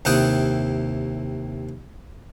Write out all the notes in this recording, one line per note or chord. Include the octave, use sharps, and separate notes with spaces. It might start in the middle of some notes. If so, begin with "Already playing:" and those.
D#2 C3 E4 F#5 G5 D#6